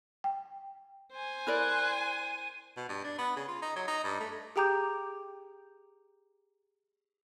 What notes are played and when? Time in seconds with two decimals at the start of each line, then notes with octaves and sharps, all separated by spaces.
0.24 G5
1.12 C5 G#5
1.47 E4 A#4 D5 F#6
1.95 D#7
2.77 B2
2.89 G2
3.04 D4
3.18 B3
3.36 C#3
3.48 F4
3.62 D#4
3.76 F#3
3.88 D#4
4.04 G2
4.20 A3
4.56 G4 G#4 G5 A#5 D6 G6